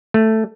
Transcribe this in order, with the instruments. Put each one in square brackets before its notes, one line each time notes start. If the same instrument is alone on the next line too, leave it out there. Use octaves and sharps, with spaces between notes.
[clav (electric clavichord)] A3